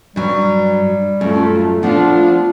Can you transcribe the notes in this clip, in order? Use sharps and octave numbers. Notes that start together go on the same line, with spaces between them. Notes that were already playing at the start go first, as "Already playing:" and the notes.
G2 F#3 G3
F#2 A3 F4
F3 A3 B3 D4 F4